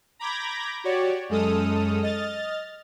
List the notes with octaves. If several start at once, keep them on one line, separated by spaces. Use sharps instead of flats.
A#5 B5 D6 G6 G#6 A#6
F#4 G4 C#5 D5
F#2 G#3 A4 D#6 F6
D#5 F6 A6